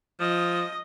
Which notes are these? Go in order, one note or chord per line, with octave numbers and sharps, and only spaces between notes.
F3 D#5